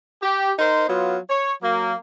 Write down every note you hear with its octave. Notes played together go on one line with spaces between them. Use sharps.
G4
D#4 A#4 C5
F#3 B3 F4
C#5
F#3 A#3